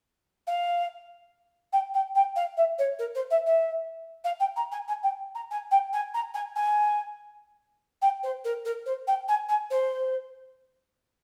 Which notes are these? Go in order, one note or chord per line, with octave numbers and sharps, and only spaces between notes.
F5
G5
G5
G5
F5
E5
C#5
A#4
C5
E5
E5
F5
G5
A#5
G#5
G#5
G5
A#5
G#5
G5
G#5
A#5
G#5
G#5
G5
C5
A#4
A#4
C5
G5
G#5
G#5
C5